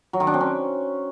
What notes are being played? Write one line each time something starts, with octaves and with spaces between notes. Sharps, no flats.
F#3
D#3
D4
C4
C#4